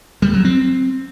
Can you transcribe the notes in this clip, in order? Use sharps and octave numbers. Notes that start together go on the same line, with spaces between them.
G3
F#3
C4